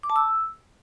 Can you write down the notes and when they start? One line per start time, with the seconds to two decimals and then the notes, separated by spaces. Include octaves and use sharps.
0.03 D6
0.10 A5
0.16 E6